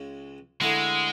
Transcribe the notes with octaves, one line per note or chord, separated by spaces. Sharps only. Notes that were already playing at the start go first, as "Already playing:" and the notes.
Already playing: C#2 C#3 G#3
D3 G#3 A3 E4 A4